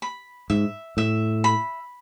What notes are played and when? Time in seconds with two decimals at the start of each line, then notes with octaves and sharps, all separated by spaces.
0.02 B5
0.50 G#2 E5
0.97 A2 E5
1.44 B5